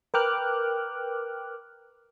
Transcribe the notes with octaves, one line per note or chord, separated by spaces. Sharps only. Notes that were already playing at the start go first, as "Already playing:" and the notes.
A#4 B4 G5 D6 F6 F#6